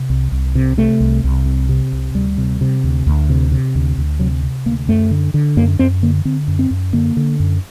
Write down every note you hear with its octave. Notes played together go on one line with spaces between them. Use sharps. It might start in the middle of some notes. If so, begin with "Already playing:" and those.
Already playing: C3
C2
C2
C3
C3 A3
C2
C2
C3
C3
C2
D2 G3
C3
C3
D2
D2
C3
C3
D2
D2
C3 F#3
C3
D2 A#3
F#2 A3
D3
D3
F#2 A#3
F#2 C4
D3 A#3
D3 C4
F#2
C4
F#2
D3 A#3
D3
F#2